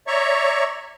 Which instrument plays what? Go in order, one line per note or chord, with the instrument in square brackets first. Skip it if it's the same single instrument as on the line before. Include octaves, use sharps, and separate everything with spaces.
[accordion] C#5 D5 E5 A#5 C#6